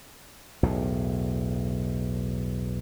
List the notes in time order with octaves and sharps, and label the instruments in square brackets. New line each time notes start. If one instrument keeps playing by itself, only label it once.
[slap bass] B1 E2 A2